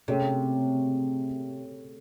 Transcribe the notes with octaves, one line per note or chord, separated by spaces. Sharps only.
C3 A3 C#4 G#4 C#5